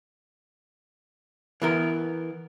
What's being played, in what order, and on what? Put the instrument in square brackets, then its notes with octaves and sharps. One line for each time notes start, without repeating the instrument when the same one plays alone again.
[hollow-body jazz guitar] E3 B3 A#4